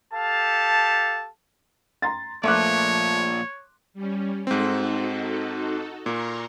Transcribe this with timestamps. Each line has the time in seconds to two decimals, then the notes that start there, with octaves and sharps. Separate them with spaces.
0.13 G4 A4 F5 A5
2.02 A#5 C6 A6
2.44 A#2 F3 A3 C#5 C6 D6 F#6
3.94 G3 C#4
4.47 G#2 C4 D#4 F#4 A4
6.06 A#2 A#3 A#5 C6 C#6